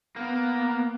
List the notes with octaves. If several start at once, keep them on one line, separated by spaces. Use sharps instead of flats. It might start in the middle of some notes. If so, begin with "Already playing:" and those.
A#3 B3